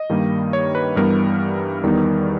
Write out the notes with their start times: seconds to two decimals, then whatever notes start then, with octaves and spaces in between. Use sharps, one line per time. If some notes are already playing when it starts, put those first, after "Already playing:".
Already playing: D#5
0.09 G2 D#3 G3 A#3 D#4
0.53 C#5
0.75 B4
0.96 G2 E3 G3 B3 A#4
1.83 E2 D#3 G3 B3 D#4